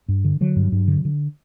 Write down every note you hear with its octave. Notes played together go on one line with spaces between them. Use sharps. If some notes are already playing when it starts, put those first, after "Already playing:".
G2
D3
D3 F#3
G2
G2
D3
D3